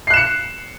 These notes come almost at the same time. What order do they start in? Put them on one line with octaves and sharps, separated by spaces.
C7 F#6 E7 C#7